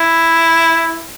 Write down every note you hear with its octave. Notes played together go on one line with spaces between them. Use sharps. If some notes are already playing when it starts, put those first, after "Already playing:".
Already playing: E4